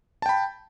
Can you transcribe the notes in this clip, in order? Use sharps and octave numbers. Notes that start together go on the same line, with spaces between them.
G5 A5 B5